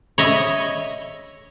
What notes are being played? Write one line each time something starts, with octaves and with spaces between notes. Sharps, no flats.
C#5 D#5 E5